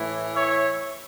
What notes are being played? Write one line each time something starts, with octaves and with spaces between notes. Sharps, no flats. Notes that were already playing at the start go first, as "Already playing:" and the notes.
Already playing: A2 E3
C#5 E5